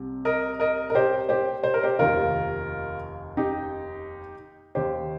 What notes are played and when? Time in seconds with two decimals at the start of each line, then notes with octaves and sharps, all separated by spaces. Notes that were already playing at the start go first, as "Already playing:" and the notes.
Already playing: C2 C3
0.25 A#4 D#5
0.60 A#4 D#5
0.90 A#4
0.95 G4 C5
1.29 G4 C5
1.64 C5
1.74 A#4
1.83 G4 C5
1.99 F1 D#2 D#3 F4 A#4
3.37 D#4 G4
4.75 D#2 D#3 G4 C5